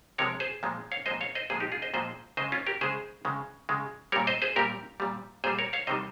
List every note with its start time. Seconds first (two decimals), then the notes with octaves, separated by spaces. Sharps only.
0.18 C3 F3 G#3 A#4 C#5
0.40 G#4 C5
0.63 A#2 F3 G#3
0.92 C#5 F5
1.06 A#2 F3 G#3 C5 D#5
1.21 C#5 F5
1.35 C5 D#5
1.50 A#2 F3 G#3 G#4 C5
1.60 D#4 G4
1.72 F4 G#4
1.82 C5 D#5
1.94 A#2 F3 G#3 C5 D#5
2.37 C#3 C5 D#5
2.41 G#3
2.52 C#4 F4
2.67 G4 A#4
2.81 C#3 G#3 G#4 C5
3.25 C#3 G#3
3.69 C#3 G#3
4.12 G3 A#4 C#5
4.16 A#2
4.27 C5 D#5
4.42 G#4 C5
4.56 A#2 G3 G4 A#4
5.00 A#2 G3
5.44 A#2 G#4 C5
5.47 G3
5.58 A#4 C#5
5.73 C#5 F5
5.87 C3 D#3 G3 C5 D#5